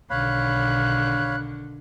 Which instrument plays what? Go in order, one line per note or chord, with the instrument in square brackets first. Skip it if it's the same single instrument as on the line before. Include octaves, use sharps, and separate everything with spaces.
[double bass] B1 [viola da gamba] D3 D#3 [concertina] C#5 F5 B5 [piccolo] F#6